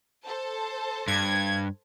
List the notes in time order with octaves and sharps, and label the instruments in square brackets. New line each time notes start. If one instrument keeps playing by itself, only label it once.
[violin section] A4 C5 A5
[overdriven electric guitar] G2 [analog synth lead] G#6